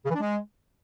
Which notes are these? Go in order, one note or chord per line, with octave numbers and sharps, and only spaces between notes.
C#3
E3
D4
G#3